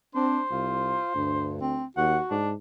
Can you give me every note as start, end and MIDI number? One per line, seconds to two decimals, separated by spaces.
0.15 0.38 60
0.15 0.43 62
0.15 1.51 72
0.51 0.99 36
0.51 1.14 65
1.15 1.82 38
1.15 1.56 43
1.61 1.85 60
1.97 2.18 39
1.97 2.35 66
1.97 2.19 78
2.31 2.54 44
2.31 2.50 62